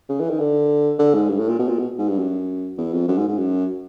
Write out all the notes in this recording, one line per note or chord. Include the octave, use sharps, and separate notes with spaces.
C#3
E3
D#3
D3
D3
G#2
G2
A2
A#2
B2
A#2
B2
G#2
G2
F#2
E2
F2
F#2
G#2
G#2
F#2